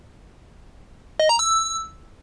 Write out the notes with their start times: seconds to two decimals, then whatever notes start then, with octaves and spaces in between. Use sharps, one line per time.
1.19 D#5
1.29 A#5
1.39 E6